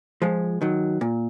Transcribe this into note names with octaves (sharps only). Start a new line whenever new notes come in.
F3 G#3
D#3 F#3
A#2